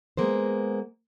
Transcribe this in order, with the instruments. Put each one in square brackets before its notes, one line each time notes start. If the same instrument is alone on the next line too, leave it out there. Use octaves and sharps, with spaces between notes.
[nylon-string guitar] G#3 A#3 B3 C5